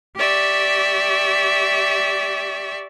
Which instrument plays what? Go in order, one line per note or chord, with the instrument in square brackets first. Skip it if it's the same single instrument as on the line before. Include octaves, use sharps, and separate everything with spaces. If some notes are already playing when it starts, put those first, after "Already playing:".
[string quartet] G4 D5 E5 C#6